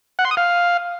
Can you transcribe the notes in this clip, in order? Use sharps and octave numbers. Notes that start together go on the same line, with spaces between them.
F#5
C6
D#6
F5